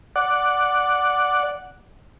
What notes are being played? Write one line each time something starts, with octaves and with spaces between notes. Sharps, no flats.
D5 F#5